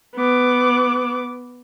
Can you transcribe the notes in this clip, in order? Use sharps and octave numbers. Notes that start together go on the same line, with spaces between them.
B3 D6